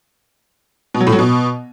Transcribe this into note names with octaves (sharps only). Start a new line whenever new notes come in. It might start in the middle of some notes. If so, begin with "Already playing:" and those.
B2
F#3
A2
F#3
B2